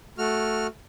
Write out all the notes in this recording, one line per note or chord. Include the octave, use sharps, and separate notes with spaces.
A3 F#4 F6